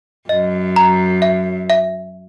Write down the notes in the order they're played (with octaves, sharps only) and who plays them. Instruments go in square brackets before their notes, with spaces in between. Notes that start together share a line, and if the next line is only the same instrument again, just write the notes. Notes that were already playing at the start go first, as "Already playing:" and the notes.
[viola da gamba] F#2 [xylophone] D#5
[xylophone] A#5
E5
E5